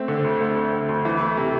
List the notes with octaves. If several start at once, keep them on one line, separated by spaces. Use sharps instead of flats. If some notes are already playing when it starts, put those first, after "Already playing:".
Already playing: A3 C4
D3
D2
A3
C4
D3
D2
E3
A3
C3